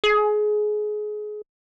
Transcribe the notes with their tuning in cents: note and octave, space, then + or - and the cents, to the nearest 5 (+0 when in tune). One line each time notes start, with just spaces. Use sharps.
G#4 +25